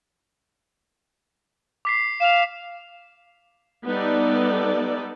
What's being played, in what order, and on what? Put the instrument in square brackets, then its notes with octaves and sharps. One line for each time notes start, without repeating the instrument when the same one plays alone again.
[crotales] D6 B6 C7
[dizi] F5 [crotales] E7 F7
[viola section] G3 B3 D#4 A4 D5